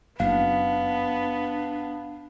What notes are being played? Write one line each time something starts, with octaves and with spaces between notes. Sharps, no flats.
F#1 B3 D4 F5